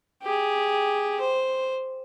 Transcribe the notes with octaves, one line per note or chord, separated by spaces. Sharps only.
G4 G#4
C5